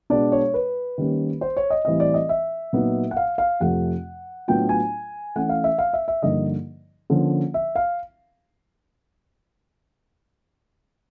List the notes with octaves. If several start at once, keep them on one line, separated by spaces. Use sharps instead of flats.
B2 G#3 B3 D4 D5
C#5
B4
D#3 G3 A#3 C#4
C5
C#5
D#5
A2 E3 G3 C4 D#5
D5
D#5
E5
A#2 F#3 B3 D#4
F#5
F5
F5
F2 C3 F3 A3 F#5
A2 F#3 B3 D4 F4 G5
G#5
E3 A3 C#4 F#5
F5
E5
F5
E5
E5
G2 D3 F3 A#3 D#4 D#5
D3 F3 A#3 C#4
E5
F5